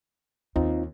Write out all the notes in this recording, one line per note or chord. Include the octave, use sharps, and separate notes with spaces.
D#2 C4 D#4 F4